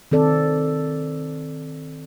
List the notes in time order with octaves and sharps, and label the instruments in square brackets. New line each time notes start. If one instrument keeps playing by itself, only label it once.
[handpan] D#3 C4 A4 D5